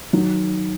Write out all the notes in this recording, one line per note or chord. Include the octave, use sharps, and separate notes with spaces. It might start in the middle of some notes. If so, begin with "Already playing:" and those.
D#3 F#3